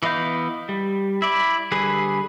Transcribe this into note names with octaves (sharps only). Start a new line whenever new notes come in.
E3 B3 D#5 F5 G6
G3
E4 D5
D3 G3 G#4 B4